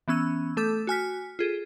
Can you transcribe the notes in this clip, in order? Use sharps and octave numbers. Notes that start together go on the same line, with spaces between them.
E3 B3 C#4 E6
A3 A4 D6 G6
F#4 G#5 F6 B6
F4 G#4 A4